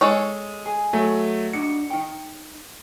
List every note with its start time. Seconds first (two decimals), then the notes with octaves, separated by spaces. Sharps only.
0.01 G#3 A4 C#5
0.66 G#4
0.93 F#3 A3
1.53 D4 D#4 F#4 C#7
1.90 D#4 G5